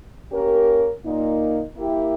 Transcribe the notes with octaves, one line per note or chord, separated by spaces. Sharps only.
A#3 C#4 G4 A#4
A#2 A#3 D#4
A#3 E4 G4